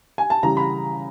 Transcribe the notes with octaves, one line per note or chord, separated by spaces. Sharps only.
G#5
A5
C#3 E3 G3 A#5
B5